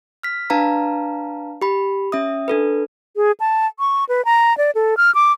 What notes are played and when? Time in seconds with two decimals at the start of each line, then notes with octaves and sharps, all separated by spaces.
0.23 F6 B6
0.50 D4 B4 F5 A5 A#5
1.62 G4 B5
2.12 C#4 E5 D#6
2.48 D4 A4 B4
3.16 G#4
3.40 A5
3.79 C#6
4.09 B4
4.25 A#5
4.58 D5
4.75 A4
4.97 F6
5.15 D6